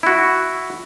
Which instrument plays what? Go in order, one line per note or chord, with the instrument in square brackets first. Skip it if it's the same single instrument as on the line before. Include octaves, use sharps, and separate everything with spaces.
[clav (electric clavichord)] E4 F#4